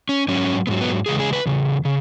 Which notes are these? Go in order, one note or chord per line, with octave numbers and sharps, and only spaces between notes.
C#4
G#2 F#3 C#4
G#2 F#3 B3
B3
E2 C#3 G#3 G#4
G#4
B4
E2 C#3
C#3